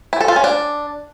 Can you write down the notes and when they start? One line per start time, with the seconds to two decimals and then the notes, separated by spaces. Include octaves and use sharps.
0.13 E4
0.21 A4
0.28 F4
0.36 C#4
0.44 D4